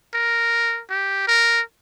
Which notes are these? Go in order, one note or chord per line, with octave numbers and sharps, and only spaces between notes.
A#4
G4
A#4